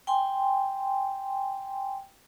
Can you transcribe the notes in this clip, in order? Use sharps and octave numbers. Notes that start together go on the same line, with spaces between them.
G5 G#5 C6